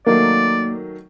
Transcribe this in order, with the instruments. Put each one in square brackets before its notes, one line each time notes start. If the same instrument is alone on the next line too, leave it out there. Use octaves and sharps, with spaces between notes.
[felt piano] D#3 F#3 A3 [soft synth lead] A#3 [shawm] D5